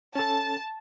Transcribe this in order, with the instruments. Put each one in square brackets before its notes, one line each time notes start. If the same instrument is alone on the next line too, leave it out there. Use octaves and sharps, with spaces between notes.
[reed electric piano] C#4 A4 [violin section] A5